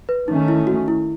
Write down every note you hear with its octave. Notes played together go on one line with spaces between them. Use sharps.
B4
D#3 A3 C#4 D#4
E4
F#4
E4